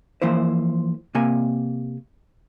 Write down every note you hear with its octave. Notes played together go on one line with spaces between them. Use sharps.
E3 F3 A#3 E4 C5
C3 A#3 G#5